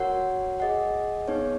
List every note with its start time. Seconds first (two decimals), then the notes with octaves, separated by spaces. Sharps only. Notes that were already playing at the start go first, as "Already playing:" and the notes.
Already playing: F#4 A#4 C#5 F#5
0.60 G#4 D#5 F#5
1.28 B3 D#4 G#4 C#5